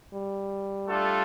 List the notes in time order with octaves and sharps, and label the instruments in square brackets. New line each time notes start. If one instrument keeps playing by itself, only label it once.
[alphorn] G3
[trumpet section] A3 D4 F4 A4